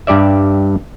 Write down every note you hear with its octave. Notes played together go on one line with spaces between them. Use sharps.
G2 G4 D5 E5